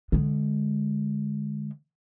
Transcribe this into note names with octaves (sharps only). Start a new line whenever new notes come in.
D3 G#3